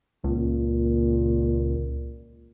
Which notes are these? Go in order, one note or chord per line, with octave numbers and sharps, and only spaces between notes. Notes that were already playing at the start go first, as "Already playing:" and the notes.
C#2 A#2